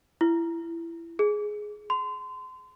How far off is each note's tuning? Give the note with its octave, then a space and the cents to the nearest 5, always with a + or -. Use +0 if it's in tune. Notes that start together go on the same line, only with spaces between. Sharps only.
E4 +20
G#4 +10
C6 -30